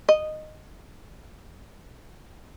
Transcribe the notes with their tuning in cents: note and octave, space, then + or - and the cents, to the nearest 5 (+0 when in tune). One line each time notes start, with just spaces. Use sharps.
D#5 -10